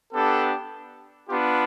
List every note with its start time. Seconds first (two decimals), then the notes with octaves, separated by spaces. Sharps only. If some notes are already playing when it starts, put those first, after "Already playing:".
0.13 B3 D4 G4 A4
1.28 B3 D4 F4 G4